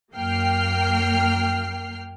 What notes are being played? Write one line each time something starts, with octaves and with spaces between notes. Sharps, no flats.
F#2 A#3 G5 F6 C7